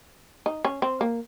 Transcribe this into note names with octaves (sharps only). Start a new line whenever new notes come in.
D#4
C#4
C4
A#3